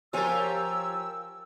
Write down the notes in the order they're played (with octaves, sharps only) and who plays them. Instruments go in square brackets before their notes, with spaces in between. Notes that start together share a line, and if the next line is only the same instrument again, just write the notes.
[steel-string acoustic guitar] F3 C#5 G#5 [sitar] F4 G4 A#4 [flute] E6